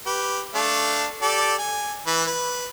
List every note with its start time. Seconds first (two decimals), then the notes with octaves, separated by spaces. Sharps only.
0.06 G4 B4
0.55 A3 D4 F5
1.22 G4 A4 D5
1.59 G#5
2.07 E3 B4
2.27 B4